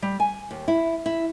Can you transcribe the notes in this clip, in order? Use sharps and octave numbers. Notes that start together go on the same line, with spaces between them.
G3
G#5
D#2
E4
E4